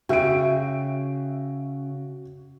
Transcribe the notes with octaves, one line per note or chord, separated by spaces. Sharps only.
C#3 F#4 E5 G5 D7